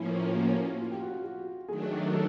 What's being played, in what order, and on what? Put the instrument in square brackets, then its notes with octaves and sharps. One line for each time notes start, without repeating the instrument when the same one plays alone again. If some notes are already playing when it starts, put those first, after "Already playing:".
Already playing: [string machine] A2 F3 A#3 C#4 [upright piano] E4
[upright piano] F#4
F4
G4
F#4
F4
F#4
[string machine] D#3 F#3 A3 D4 [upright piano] G#4
[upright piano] A4